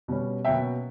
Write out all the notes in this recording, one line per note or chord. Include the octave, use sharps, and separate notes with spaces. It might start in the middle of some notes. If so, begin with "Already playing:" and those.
B2 G3 C#4
B2 F#3 A#3 C#4 E5 G5